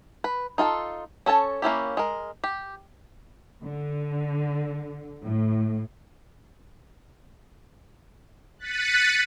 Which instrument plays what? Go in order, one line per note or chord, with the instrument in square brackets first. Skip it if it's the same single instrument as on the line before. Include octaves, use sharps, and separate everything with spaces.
[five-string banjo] B4
D#4 F4 G#4 A4
C#4 A4 C#5 A5
A#3 C#4 E4 G4
G#3 A#4
G4
[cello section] D3
A2
[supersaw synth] F#6 A6 B6 C#7 D#7